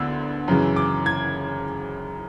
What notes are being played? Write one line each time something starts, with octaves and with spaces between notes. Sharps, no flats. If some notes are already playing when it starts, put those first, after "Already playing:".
Already playing: D2 D3 B3 E6
F#2 C#3 E3
D6
G#6